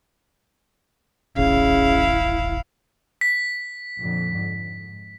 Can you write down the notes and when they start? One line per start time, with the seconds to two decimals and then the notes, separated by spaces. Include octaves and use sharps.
1.37 D#1 A1 C#3 E4 F5
3.21 B6
3.99 F2 A#2 D3
4.36 G#2